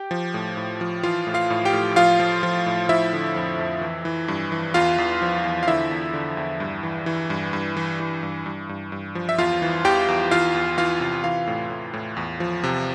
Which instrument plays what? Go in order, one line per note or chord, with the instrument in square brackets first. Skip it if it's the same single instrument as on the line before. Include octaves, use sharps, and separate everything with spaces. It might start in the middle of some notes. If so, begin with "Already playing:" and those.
Already playing: [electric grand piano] G4 G5
F3
A2
A2
F3
E3 F4 F5
A2
F4 F5
A2
G4 G5
A2
F3 F4 F5
F3
F3
A2
F3 E4 E5
D3
F2
F2
E3
E3
G2
E3
E2 F4 F5
E2
F3
E2
F5
D3 E4 E5
E2
D3
E2
G2
E3
E3
G2
G2
E3
E3
G2
G2
G2
G2
F3
E5
E2 F4 F5
E3
E2 G4 G5
E2
E3 F4 F5
E2
E3 F4 F5
C3
E3 F4 F5
A2
A2
A2
E2
F3
C3